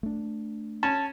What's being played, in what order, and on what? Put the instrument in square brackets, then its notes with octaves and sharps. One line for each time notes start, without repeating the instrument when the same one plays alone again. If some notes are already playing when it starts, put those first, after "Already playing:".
[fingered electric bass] A3 D4
[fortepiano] C#4 [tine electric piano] A5